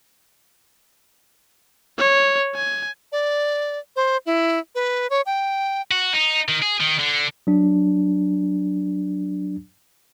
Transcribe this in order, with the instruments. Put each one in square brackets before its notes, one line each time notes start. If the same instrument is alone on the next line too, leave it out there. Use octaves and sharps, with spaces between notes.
[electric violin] C#5
G#5
[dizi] D5
C5
E4
B4
C#5
G5
[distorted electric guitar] F#4
D#4
D#3
G#4
D#3
D3
[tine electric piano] F#3 D4